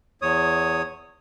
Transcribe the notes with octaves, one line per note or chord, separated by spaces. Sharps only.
E2 C#5 D#6